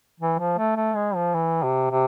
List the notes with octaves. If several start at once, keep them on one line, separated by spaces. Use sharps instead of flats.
E3
F3
A3
A3
G#3
F3
E3
C3
C3